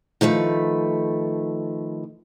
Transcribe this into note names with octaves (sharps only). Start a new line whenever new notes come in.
D#3 F3 A3 B4